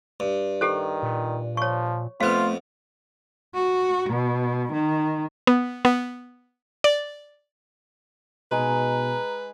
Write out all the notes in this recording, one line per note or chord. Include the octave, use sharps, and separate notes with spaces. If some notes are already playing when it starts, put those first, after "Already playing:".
G2
D#3 G4 A4 C5
A#2
F3 C#5 C#6
F2 A3 B3 F4 B4 C5 F5
F#4
B2
D#3
B3
B3
D5
B2 G#3 D#4 G#4 B4 A#5